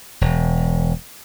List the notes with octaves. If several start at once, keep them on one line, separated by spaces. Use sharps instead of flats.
E1